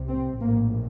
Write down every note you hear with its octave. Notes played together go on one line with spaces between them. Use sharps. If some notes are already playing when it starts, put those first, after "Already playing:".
Already playing: C2 C3
C4
A#1 A2 A#3